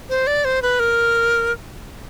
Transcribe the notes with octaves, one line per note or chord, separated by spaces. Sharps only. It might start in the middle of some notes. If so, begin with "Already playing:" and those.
C5
D5
C5
B4
A#4